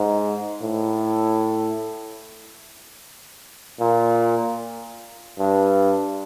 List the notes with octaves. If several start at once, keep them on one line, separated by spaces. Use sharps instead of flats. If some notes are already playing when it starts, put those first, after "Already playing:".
Already playing: G#2
A2
A#2
G2